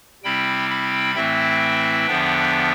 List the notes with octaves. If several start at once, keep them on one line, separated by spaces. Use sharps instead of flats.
C3 G3 C4 E4 G5 B5
G5 B5
A2 E3 A3 C4 E4 E5 G5
E2 D3 F3 B3 D4